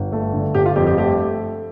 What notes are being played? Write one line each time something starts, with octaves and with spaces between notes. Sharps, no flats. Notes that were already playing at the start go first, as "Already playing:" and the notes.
Already playing: G1
A3
D3
G1 G4
F4
F2 G4
G4
A3 G4